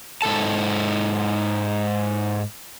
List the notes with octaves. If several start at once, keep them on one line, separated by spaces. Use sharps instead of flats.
G#2 E3 A4 A5